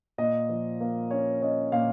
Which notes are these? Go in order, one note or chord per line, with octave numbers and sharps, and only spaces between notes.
A#2 D#5
F3
A#3
C#4 C#5
C#4 D#5
A#2 F5